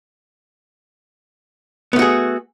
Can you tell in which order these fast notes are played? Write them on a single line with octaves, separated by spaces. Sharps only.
B3 A3 F#4 G#4